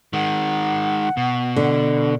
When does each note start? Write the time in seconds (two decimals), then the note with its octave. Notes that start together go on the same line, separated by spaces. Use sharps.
0.13 D#3 G#3 F#5
1.17 B2
1.56 D3